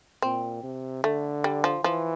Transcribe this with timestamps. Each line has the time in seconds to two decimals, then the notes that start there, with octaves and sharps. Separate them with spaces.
0.22 A#2 C4
0.63 C3
1.04 D3 A3
1.44 G3
1.64 F3
1.84 E3 F3